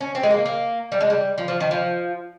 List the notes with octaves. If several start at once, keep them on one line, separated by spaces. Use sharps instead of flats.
C#4
C4
G#3
A#3
A#3
G3
G#3
G3
F3
F3
D#3
F3